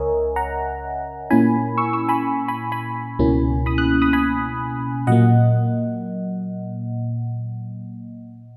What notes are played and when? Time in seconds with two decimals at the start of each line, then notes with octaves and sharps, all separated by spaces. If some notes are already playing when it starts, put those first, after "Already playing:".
Already playing: C#2 C#3 A#4 C#5 D#5 E5 G#5
0.36 F#5 A#5
1.30 A#2 A#3 C#4 E4 G#5 B5
1.78 C#6 E6
1.93 C#6 E6
2.09 G#5 B5
2.48 G#5 B5
2.72 G#5 B5
3.19 C#2 B2 A#3 C#4 E4
3.66 B5 D#6
3.78 D#6 F#6
4.02 B5 D#6
4.13 G#5 B5
5.07 A#2 F#3 A#3 D#5 F#5